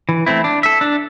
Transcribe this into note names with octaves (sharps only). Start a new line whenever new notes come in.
E3
A3 C4 E4
D4
A4 E5
D4